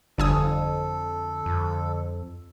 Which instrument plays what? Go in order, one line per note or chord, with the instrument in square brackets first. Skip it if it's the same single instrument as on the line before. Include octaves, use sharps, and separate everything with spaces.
[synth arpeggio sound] G1 G#5 D#6 [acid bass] F2 [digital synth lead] D3 [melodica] A4
[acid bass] F2